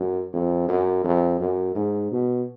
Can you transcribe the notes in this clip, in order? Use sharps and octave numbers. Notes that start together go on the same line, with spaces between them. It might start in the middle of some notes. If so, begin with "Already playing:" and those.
Already playing: F#2
F2
F#2
F2
F#2
G#2
B2